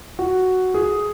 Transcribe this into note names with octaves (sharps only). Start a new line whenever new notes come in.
F#4
G#4